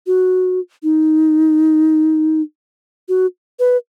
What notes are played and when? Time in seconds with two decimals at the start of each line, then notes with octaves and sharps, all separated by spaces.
0.07 F#4
0.83 D#4
3.09 F#4
3.59 B4